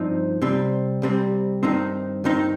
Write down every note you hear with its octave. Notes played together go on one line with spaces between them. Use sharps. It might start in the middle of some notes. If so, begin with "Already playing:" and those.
Already playing: G2 F3 C4 D#4
C2 C3 G3 C4
C2 C3 G3 C4
G2 D#3 C4 D#4
G2 D#3 C4 D#4